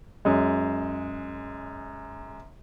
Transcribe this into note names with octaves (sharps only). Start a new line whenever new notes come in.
F#2 G#3